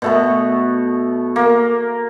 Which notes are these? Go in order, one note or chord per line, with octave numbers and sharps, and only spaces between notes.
B2 A3 B3
A#3